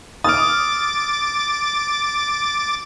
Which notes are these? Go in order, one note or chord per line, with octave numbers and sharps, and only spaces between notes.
D6 D#6 F6 A6